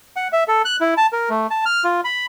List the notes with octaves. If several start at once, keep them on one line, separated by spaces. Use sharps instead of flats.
F#5
E5
A4
F#6
E4
A5
A#4
A3
A5
F6
F4
B5